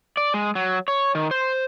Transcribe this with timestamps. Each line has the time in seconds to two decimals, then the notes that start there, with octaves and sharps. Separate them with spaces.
0.17 D5
0.34 G#3
0.55 F#3
0.88 C#5
1.15 D#3
1.31 C5